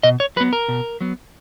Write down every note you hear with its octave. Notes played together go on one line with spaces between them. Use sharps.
B2 D#5
C#5
F#3 B3 B4
A#4
B2
F#3 B3